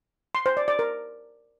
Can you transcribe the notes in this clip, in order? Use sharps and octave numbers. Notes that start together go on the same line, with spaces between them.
C6
C5
D5
D5
A#4